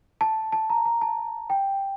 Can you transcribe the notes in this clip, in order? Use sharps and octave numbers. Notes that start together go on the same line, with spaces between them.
A5
A5
A#5
A#5
A5
G5